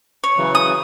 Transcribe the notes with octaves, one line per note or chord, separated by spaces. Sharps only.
C#5
C#3 E3 F#3
D#6